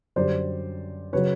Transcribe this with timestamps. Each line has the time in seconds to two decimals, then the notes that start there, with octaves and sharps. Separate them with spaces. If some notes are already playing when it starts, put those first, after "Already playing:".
0.16 F#2 D3 G3 C5 D5
1.13 C#3 F#3 B4 C#5